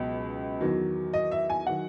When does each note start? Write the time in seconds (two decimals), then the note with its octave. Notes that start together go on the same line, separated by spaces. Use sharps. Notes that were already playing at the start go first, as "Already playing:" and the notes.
Already playing: C#2 B2 F#3
0.61 E2 D#3 F#3
1.13 D#5
1.31 E5
1.50 G#5
1.66 D#3 F#3 F#5